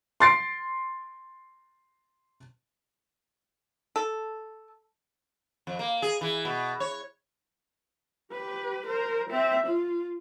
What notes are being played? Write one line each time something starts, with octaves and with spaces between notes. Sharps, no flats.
C6 A6 C7 D7
A4
F2
A#3
G#4
E3
B2
C#5
G4 B4
A#4 C5
C4 E5
F4